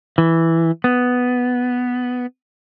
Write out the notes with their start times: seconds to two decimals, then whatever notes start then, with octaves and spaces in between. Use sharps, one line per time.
0.18 E3
0.84 B3